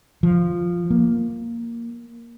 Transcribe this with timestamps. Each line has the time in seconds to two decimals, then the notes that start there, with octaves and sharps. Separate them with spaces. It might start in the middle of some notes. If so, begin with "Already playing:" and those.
0.23 F3
0.91 A#3